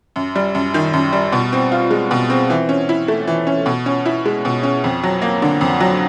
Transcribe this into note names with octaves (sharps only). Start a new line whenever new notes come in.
F#2
G3
F#2
D#3
F#2
G3
B2
C4
F4
G#3
B2
C4
E3
C#4
E4
A3
E3
C#4
B2
C#4
E4
G#3
B2
C#4
F2
F#3
A#3
D3
F2
F#3